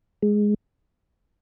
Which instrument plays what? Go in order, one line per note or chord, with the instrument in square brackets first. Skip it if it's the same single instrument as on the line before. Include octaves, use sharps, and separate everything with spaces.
[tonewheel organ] G#3